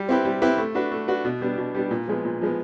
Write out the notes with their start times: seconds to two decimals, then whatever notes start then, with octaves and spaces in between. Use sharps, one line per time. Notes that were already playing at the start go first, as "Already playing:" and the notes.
Already playing: G3
0.09 C4 E4 G4 B4
0.25 G3
0.42 C4 E4 G4 B4
0.58 A3
0.75 D4 F#4 B4
0.91 A3
1.08 D4 F#4 B4
1.25 B2
1.41 G3 B3 D4
1.58 B2
1.74 G3 B3 D4
1.91 A#2
2.08 F3 G#3 B3
2.25 A#2
2.41 F3 G#3 B3